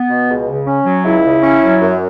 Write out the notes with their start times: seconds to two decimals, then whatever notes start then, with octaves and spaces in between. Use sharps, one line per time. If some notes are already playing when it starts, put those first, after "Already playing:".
Already playing: B3
0.09 B2
0.28 C#2
0.47 C#3
0.66 C#4
0.85 F#3
1.04 C#2 E4
1.24 C#3
1.43 C#4
1.62 F#3
1.81 F#2